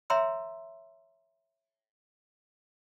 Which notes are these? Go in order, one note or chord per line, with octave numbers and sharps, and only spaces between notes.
C#5 E5 G5 A#5 C6 E6